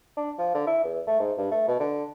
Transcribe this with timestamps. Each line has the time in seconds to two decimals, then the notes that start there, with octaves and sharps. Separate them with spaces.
0.17 D4
0.38 F3
0.54 D3
0.67 E4
0.84 E2
1.07 A3
1.20 G#2
1.37 G2
1.51 A3
1.68 B2
1.79 D3